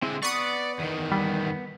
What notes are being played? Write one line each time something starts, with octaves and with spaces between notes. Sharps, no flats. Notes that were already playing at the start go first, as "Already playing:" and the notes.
D3 G#3 C4 E4
B3 B4 D5 F#5 C#6 D#6 C#7
E2 D#3
G3 B3